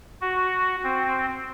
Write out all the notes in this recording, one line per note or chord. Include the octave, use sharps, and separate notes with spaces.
F#4
C4